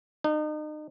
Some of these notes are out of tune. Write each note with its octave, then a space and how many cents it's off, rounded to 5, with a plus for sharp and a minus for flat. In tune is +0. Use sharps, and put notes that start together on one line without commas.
D#4 -35